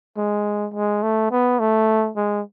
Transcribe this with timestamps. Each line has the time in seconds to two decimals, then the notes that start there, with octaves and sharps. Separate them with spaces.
0.17 G#3
0.74 G#3
1.03 A3
1.31 B3
1.60 A3
2.17 G#3